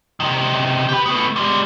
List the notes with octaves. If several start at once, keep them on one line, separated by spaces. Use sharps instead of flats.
C3 D#3
G4 B4
A3 B3
G3 G#3